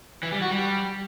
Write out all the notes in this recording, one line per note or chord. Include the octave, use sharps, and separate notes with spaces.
E3
G3
F#4
G3